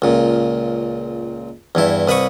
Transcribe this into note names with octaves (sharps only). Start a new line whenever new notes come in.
C#2 A#2
E2 G2 E4
C2 B4 D#5 B5 C#6